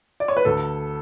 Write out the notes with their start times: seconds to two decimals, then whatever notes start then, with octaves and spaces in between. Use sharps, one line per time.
0.20 D5
0.28 C#5
0.37 B4
0.45 D2 A4